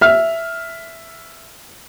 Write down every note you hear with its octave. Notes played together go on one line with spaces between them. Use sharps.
E5 F6